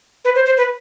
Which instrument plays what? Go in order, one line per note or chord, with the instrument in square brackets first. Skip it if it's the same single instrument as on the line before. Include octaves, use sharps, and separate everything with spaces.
[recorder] B4
C5
C5
B4